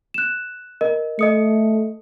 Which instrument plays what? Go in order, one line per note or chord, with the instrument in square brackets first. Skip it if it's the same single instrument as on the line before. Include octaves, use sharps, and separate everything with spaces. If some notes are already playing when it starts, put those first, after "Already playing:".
[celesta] F#6 E7
A#4 D#5
[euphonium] A3 [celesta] D#5 D#6 C#7